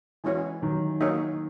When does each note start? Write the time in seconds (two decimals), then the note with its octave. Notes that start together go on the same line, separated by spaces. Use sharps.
0.24 E3 G#3 C#4 F#4 C#5
0.62 D#3 F#3
1.01 A#3 D#4 F#4 A#4 C#5